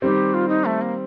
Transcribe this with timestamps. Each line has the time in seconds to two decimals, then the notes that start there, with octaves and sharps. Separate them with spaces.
0.02 D#3 G3 C4 G4
0.34 F4
0.49 D#4
0.65 A3
0.81 A#3